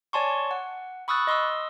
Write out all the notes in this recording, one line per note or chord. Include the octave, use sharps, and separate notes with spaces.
C#5 D5 G#5 A5 C6 C#6
F#5
B5 C#6 D#6 E6 F#6 A6
D#5 C6 D#6 E6